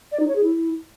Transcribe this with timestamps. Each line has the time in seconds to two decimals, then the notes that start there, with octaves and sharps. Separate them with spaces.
0.12 D5
0.20 D#4
0.28 C#5
0.35 G#4
0.43 E4